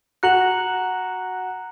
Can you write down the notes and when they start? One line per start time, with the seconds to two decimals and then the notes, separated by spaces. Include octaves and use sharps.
0.23 F#4 A#5 F#6 C#7 F#7